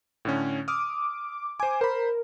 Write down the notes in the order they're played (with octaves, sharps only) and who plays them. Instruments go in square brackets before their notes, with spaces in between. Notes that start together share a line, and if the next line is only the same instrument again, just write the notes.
[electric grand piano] A2 D3 C#4
[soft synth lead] D6 [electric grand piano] D#6 F6
[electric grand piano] C5 D6 [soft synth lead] G#5
[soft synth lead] A#4 [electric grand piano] C5 B5